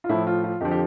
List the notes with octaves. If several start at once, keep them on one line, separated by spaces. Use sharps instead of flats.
F4
A2 F3 E4
F4
F4
F2 D3 F3 G4
G4